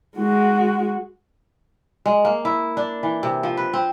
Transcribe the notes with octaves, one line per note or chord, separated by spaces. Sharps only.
G#3 F#4
G#3
A#3
E4
D4
E3
C3
F3
B4
C4